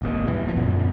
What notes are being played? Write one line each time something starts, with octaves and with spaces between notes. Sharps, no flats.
D#1 G#1 D#2
G2 B2 E3
D1 F3
G1 F#2 A#2 B3